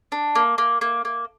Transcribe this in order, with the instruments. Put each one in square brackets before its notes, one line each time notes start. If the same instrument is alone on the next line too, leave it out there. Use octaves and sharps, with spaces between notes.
[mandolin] D4
A#3
A#3
A#3
A#3